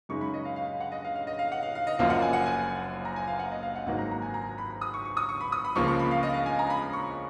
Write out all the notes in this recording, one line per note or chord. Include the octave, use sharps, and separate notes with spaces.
F#2 C#3 G#3 D#4 C#6
B5
D#5
F5
F5
F5
F#5
D#5
F5
F5
D#5
F5
F#5
F5
F5
D#5
F#1 F#2 F3 A#3 F5
F#5
G#5
F#5
G#5
A#5
G#5
F5
F#5
D#5
F5
F#5
G#1 G#2 F#3 A#3 F#5
A#5
A#5
G#5
A#5
B5
D#6
C#6
C#6
D#6
C#6
B5
D#6
B5
C#2 C#3 F3 A#3 C#6
C#6
B5
F5
D#5
F5
G#5
A#5
B5
C#6